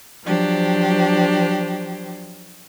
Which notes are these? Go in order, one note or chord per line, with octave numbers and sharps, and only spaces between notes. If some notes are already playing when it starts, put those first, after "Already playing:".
F3 F#3 D4 G4 C5